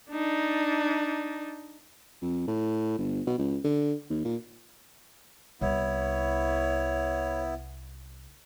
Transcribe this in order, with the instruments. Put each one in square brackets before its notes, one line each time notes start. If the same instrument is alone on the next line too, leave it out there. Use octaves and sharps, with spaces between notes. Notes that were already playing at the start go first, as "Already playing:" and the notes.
[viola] D4 D#4
[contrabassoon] F2
A2
G1
B2
C#2
D3
D#2
A#2
[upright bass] C2 [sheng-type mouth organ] B3 E4 [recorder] C#5